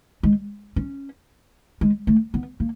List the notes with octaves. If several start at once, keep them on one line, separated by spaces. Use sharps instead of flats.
G#3
C#4
G#3
A3
B3
A#3